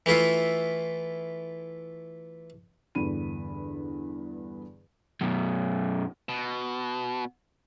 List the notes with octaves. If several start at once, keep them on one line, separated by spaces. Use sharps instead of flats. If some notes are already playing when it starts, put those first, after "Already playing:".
E3 A3 E4 F4
E2 G2 D3 B5 D#7
F#2 B2
B2